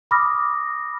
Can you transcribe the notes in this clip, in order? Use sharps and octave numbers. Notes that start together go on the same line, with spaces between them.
B5 D6 D#6 F6 A#6